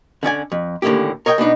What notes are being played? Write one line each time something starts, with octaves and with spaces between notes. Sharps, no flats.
D3 C#4 D5 G#5
F2
D#2 A2 D3 A#3 C#4 G4
A#4 C#5 D#5 F#5 G5
B2 B3 D4 D#4